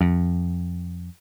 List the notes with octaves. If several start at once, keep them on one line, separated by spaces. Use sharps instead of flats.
F2